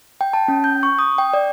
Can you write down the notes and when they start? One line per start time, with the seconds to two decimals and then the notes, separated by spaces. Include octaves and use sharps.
0.21 G5
0.33 A5
0.48 C#4
0.64 G6
0.83 C#6
0.99 D#6
1.18 G5
1.33 D5